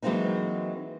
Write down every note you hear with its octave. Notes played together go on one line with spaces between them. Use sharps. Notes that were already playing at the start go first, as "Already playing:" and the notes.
E3 F#3 G#3 A#3 C4 D#4